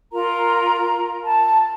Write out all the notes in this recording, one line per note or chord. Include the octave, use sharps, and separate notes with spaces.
F4 A#4 A#5
A5